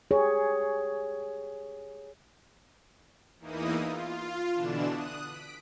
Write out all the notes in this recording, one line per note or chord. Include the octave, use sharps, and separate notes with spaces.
G4 G#4 C#5
E2 E3 A#3 D#4 E4 D#6
F4
B2 D3 E3 D4 E7
D#6 F#6
B6 D7